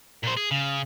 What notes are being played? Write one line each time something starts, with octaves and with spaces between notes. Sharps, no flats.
A#2 C5
G#4
C#3